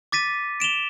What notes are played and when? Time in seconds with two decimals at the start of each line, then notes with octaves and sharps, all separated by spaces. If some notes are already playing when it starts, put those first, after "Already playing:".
0.12 D6 A6 B6 D#7
0.60 D7 E7 F7 G7